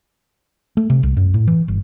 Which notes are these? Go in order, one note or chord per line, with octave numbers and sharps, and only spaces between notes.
A3
C3
C2
F#2
A2
E3
G1